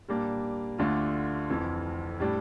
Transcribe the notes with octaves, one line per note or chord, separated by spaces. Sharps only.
A#2 G3 A#3 D4
D2 D3 A3 D4 F4
F1 F2 E3
A2 G3 D4 G4